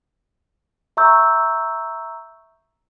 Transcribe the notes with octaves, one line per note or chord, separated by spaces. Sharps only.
E5 A#5 C#6 E6 G6